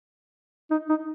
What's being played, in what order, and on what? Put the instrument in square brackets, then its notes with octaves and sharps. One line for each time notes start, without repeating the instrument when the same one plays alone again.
[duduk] D#4
D#4